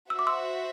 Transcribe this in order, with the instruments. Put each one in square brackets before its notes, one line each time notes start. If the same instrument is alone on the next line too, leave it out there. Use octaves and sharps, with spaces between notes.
[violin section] F#4 C5 E5 [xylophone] E6
[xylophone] D6
C6 E6